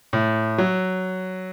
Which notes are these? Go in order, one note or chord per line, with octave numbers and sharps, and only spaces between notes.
A2
F#3